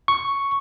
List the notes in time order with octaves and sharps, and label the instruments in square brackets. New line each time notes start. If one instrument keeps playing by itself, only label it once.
[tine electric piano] C#6